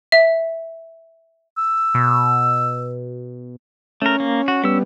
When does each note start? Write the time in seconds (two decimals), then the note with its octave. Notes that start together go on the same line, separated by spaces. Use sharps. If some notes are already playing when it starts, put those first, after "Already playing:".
0.12 E5
1.58 E6
1.94 B2
4.02 A3 C#4 A#4
4.20 A#3
4.48 F#4
4.64 G3 B3 C#4 E6